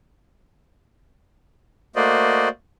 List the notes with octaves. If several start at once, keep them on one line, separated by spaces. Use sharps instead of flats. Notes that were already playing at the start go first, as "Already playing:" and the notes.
A3 A#3 F#4 C5 D5 D#5